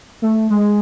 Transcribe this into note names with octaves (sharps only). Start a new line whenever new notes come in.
A3
G#3